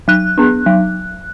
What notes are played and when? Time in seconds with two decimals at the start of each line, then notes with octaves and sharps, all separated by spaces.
0.08 F#3 F#6
0.38 B3 D4
0.66 F#3